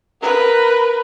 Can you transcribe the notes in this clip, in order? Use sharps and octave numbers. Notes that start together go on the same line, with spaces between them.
A#4 B4